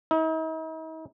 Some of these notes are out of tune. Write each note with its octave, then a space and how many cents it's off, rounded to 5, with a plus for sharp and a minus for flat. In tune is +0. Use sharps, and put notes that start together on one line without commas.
D#4 +45